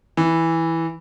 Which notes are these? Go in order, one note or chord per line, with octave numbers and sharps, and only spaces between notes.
E3